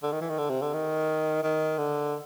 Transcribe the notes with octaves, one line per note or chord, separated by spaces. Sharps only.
D3
D#3
E3
D#3
D3
C3
D3
D#3
D#3
D3